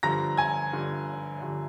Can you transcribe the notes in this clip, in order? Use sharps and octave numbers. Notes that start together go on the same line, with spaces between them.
G2 D3 F3 A#5 A#6
G#5 G#6
G2 D3 F3
G2 D3 F3